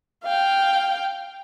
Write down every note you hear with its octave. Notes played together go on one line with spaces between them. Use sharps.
F5 G5